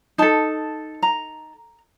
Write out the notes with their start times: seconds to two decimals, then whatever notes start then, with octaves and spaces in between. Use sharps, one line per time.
0.18 D#4 A4 A5
1.03 A#5